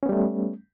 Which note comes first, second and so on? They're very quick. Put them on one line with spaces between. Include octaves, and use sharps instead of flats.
C#4 B3 G3 A3